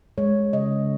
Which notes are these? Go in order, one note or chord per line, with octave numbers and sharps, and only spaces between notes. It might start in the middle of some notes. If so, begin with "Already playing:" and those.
G#3 C#5
C#3 D#5